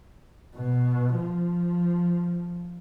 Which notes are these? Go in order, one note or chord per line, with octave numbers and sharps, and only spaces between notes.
B2
F3